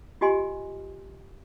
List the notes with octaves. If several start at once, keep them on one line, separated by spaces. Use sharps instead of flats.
F4 G4 D#5 G#5 C6